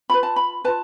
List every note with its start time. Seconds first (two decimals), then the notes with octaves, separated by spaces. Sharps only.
0.10 F4 B4 B5
0.23 A5
0.36 B5
0.65 F4 B4 A5